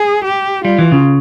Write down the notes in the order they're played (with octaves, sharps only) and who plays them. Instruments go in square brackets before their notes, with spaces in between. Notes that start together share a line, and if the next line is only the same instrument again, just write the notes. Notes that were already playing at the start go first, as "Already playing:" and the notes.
Already playing: [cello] G#4
G4
[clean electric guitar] G3 [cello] F4
[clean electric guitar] E3
C#3